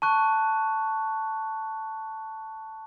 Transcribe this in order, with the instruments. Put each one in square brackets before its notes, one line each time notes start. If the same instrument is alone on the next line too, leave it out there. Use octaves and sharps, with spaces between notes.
[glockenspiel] A5 C#6 F#6